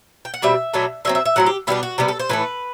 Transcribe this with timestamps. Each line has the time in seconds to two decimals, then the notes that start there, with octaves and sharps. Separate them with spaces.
0.25 G5
0.34 F#5
0.42 B2 G3 C4 E5
0.73 B2 F#3 A3 D4
1.05 D3 F#3 C4 E5
1.15 E5
1.25 E5
1.36 A2 F#3 C4 F#5
1.46 G4
1.67 B2 G3 B3 D4 E4
1.83 F#4
1.98 C3 G3 B3 G4
2.08 A4
2.19 C5
2.29 A2 E3 A3 B4